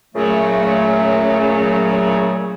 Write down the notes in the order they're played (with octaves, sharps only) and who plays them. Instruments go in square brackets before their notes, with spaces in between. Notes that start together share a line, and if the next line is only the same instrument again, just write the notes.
[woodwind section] A#2 C#3 F#3 A3